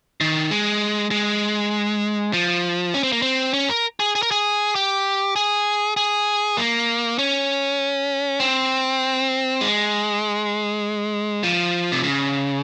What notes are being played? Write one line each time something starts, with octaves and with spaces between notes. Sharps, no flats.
D#3
G#3
G#3
F3
C#4
C4
A#3
C4
C#4
A#4
G#4
G#4
A#4
G#4
G4
G#4
G#4
A#3
C#4
C4
G#3
F3
C3
C#3